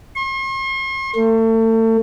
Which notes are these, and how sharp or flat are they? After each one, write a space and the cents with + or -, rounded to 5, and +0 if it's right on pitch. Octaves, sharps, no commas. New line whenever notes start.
C6 +45
A3 +35